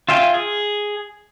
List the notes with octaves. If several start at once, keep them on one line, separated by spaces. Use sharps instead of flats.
F4 E5 F5 G5 G#5
G#4